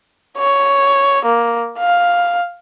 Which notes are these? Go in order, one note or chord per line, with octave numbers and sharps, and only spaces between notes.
C#5
A#3
F5